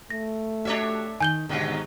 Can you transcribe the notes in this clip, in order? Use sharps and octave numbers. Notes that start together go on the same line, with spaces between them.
A3 A#6
D4 F#4 G4 C#5 E5
D#3 G#5 G6 G7
D#2 G#2 B2 D3 D#3 F#3